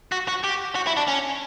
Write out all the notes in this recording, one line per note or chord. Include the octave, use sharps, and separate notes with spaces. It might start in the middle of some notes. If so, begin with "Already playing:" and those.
F#4
F#4
G4
F#4
E4
D4
C#4